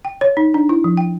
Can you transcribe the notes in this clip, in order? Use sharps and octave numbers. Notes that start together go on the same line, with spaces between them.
G5
C#5
D#4
D4
E4
F3
G5